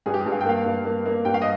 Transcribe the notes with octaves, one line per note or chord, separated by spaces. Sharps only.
G2 G#4
G4
G#4
G2
F5
G5
A#3 F5
G2
A#3
A#3
G2 G5
F5
D#5